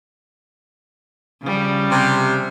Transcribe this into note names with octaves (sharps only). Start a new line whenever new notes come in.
C#3 F3 G3
C3